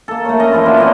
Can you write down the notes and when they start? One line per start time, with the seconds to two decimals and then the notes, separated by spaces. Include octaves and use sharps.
0.08 A#3 A4
0.25 A3 C#5
0.39 C#4 D#5 A#5
0.52 E3 F3 E4 F4
0.65 A#2 D4 F#4 C6
0.77 E3 A3 C4 D#5